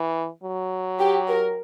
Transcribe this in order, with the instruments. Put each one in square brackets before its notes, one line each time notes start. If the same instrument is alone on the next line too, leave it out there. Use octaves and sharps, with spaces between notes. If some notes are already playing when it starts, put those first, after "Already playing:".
Already playing: [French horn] E3
F#3
[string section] G4
A#4